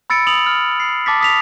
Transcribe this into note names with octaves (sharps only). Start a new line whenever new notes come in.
B5 E6 A6 C#7 D7
D#6 F7 F#7
F6
C7
A5 D6 A6 B6
D#6 B6 F7